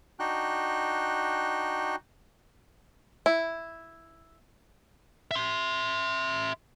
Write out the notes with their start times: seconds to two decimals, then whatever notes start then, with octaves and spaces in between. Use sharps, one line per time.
0.19 D4 D#4 F#4 G5 F#6
3.26 E4
5.31 E5 C6